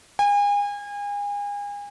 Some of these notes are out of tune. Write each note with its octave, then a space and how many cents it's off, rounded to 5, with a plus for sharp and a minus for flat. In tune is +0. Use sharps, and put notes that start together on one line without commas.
G#5 -35